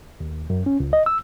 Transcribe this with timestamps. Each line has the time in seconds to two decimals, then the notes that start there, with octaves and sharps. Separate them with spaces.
0.20 D#2
0.50 F#2
0.66 C#4
0.80 C#2
0.93 D#5
1.06 E6